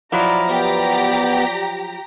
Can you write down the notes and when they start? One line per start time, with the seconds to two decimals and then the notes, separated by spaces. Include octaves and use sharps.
0.12 F3 F#3 E4 D5 A#5
0.49 B3 G4 D5 A#5